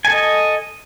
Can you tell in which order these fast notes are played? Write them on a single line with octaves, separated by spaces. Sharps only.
G#5 A4 D#5